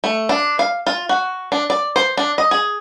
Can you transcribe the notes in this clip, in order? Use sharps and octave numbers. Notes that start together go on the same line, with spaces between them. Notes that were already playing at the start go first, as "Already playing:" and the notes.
A3
D4
F5
F4
F#4
D4
D5
C5
D4
D#5
G#4